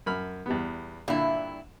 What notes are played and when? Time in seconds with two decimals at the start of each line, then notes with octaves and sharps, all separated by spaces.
0.06 F#2 B5 F6
0.46 E2 G3 B3
1.08 G2 A#2 D3 D4 E4